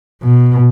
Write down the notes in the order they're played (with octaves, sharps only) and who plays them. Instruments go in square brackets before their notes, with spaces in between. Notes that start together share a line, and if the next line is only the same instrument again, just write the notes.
[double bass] B2